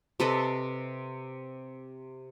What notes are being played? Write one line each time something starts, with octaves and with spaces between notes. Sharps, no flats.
C3 A4 B4 D#5